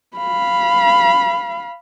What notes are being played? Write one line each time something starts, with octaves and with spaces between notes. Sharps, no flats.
F5 B5